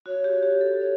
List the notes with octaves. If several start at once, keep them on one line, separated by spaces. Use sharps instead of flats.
F#4 C#5
G4
G4
A4
C#5